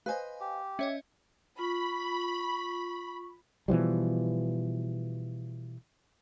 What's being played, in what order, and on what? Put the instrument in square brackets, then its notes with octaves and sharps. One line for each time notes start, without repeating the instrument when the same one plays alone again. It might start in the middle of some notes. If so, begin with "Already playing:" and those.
[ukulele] B4 C5 D#5 [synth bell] F5 G#5
[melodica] G4
[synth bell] C#4 C#5 D#5 [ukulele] E5
[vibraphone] F4 [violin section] B5 [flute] C#6
[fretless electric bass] B2 E3 F3 G3